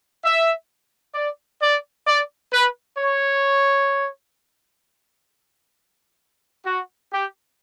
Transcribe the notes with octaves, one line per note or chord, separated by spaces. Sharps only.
E5
D5
D5
D5
B4
C#5
F#4
G4